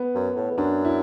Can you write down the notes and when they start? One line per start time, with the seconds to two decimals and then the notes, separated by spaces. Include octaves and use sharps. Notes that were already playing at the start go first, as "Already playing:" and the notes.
Already playing: B3
0.15 F#2
0.36 A2
0.51 E2
0.58 F#2 D4
0.85 E4